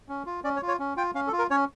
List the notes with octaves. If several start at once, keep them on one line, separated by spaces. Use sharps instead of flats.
C#4
F4
C#4 D5
C#5
F4
C#5
C#4
F4 G5
C#4 F5
A4
F4
A#4
C#4 C#5